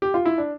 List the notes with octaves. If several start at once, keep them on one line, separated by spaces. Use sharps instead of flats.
G4
F4
E4
D4